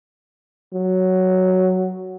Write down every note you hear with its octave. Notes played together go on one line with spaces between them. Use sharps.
F#3